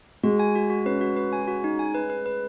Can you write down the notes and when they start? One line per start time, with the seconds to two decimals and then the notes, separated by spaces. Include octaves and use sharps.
0.23 G#3 F#4
0.39 G#5
0.55 F#4
0.70 F#4
0.86 C#4 B4
1.01 F#4
1.16 B4
1.33 G#5
1.48 F#4
1.64 D#4
1.79 G#5
1.95 B4
2.10 B4
2.26 B4